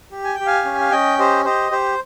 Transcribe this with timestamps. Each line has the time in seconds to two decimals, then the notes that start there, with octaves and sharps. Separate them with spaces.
0.12 G4
0.24 G#5
0.35 G4 G5
0.47 F5 G#5
0.65 C#4
0.80 F5
0.92 C#4 D#5 G5
1.19 G4 C5 D#5
1.45 G4 C5 D#5
1.71 G4 C5